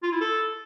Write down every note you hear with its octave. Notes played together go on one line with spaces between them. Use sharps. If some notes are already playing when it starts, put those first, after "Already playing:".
F4
E4
A4